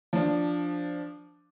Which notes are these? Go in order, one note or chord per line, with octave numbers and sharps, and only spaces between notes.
F3 D4